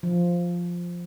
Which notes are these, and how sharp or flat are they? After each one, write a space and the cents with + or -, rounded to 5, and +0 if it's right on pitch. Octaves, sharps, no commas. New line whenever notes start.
F3 +0